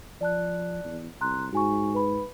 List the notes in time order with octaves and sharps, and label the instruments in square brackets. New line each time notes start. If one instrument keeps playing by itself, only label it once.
[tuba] F3 [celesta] D5 A5 F#6
[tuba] E2
[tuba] C2 [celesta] A#5 C6 F#6
[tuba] G#2 [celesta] F#4 G#5 C#6
[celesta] B4 B5